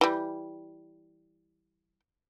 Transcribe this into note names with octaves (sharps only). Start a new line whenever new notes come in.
E3 G3